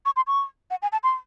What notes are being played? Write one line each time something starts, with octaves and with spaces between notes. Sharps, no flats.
C#6
C6
C#6
F#5
G#5
A5
C6